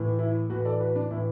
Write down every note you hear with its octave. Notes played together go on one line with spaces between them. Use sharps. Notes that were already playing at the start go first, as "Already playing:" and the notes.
Already playing: A2 E3
E4
A2 E3 F#4 B4
A4 D5
F#4 B4
D4
A2 E3 E4